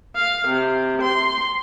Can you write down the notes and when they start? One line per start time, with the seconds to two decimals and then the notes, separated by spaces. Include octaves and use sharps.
0.15 F5
0.48 C3
1.01 C6